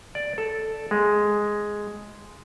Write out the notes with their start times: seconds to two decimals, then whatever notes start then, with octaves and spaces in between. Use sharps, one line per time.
0.15 D5
0.38 A4
0.91 G#3